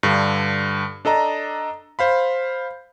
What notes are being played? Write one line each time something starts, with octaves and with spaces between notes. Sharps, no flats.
G2 D3
D4 A4 D#5 A#5
C5 F5 B5